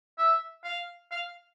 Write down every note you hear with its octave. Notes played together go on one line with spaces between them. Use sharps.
E5
F5
F5